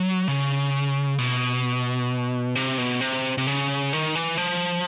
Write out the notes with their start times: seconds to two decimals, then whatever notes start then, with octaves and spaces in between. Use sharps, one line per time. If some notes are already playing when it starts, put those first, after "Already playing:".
Already playing: F#3
0.28 C#3
1.18 B2
2.55 C3
2.78 B2
3.01 C3
3.38 C3
3.47 C#3
3.93 D#3
4.15 E3
4.38 F3